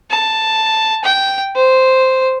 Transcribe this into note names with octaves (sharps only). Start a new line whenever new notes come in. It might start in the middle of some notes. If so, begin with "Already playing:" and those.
A5
G5
C5